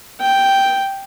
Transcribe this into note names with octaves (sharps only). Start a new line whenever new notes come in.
G5